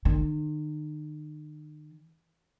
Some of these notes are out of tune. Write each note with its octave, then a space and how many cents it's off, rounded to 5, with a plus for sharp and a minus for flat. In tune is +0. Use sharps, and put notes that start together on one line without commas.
D#3 -40